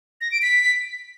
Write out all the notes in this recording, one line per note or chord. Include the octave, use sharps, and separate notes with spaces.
A#6
D7
B6